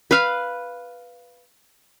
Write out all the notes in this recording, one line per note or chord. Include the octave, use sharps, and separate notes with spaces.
B4 F5